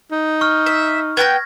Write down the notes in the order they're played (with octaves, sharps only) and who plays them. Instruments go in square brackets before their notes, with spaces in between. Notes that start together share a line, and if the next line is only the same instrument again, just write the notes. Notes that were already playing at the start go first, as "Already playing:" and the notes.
[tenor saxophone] D#4
[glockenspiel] C#6 F6
[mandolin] E5
[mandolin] B3 G5 G6 [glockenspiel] G#6 A#6